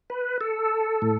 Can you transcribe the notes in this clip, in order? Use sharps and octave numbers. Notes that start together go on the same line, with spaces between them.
B4
A4
A2